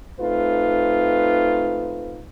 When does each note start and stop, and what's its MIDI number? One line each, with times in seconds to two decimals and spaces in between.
0.18 2.21 57
0.18 2.21 60
0.18 2.21 63
0.18 2.21 65
0.18 2.21 71